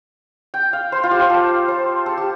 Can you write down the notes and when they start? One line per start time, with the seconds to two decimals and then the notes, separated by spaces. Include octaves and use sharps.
0.54 G5
0.73 F5
0.92 C5
1.03 F4
1.11 G4
1.22 C5
1.30 A4
1.68 C5
2.06 A4
2.18 G4